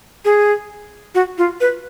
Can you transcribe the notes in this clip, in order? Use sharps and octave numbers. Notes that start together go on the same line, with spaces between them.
G#4
F#4
F4
B4